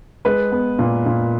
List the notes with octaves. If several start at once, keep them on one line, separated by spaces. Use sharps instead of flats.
G#3 B4
B3
A#2
A#2